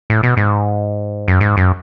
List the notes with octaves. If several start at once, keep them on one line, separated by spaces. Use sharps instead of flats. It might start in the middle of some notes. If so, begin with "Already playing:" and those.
A2
B2
G#2
F#2
G#2
F#2